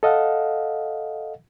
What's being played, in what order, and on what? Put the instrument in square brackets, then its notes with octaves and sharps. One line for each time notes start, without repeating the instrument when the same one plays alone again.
[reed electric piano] A4 D#5 F5 F#5